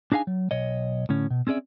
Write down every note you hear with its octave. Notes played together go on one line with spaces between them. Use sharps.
D4 D#4 G#4 F5 G#5
F#3
B1 C#5 D#5
A2 D3 C#4
B2
C4 C#4 G#4 D5 E5